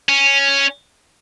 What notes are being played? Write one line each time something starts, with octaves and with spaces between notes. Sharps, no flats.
C#4